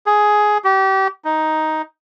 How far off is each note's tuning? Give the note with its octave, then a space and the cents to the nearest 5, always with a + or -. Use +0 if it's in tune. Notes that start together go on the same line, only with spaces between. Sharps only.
G#4 +10
G4 -30
D#4 +5